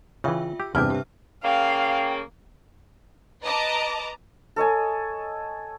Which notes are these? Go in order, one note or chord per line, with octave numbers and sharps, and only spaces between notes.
C#3 E3 F4 E5 G5
G4 E6
E2 G2 C3 E4 G5 A5 D6 F6
G4 E5
C#3 A#3 F5 G5
B4 D#5 A5 A#5 D6
A4 C#5 D#5 G#5